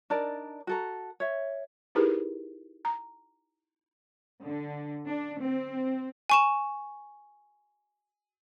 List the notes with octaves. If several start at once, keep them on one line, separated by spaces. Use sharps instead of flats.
D4 D#4 A#4 D5
F#4 A4 A#5
C#5 E5
D#4 E4 G4 G#4 A#4 B4
A#5
D3
D4
C4
G#5 C#6 E7